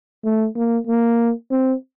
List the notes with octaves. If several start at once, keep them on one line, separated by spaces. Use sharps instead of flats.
A3
A#3
A#3
C4